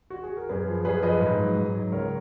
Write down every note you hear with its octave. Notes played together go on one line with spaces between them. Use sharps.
F#4
G#4
A#4
F#2 G#4 B4
F3
F#2 G#4 B4
F3 B4 D#5
G#2
F#3
G#2
F#3
C#2 A#4 C#5